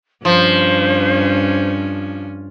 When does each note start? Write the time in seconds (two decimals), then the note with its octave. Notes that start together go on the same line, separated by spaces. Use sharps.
0.25 G2 F3 C#4 C5